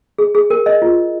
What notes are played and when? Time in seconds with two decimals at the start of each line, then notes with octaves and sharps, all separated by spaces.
0.18 G#4
0.35 G#4
0.50 A#4
0.66 D#5
0.82 F4